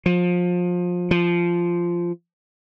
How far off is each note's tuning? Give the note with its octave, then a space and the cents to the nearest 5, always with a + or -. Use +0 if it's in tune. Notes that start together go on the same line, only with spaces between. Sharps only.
F3 +25
F3 -10